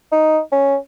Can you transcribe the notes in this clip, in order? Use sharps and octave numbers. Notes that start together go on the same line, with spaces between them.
D#4
C#4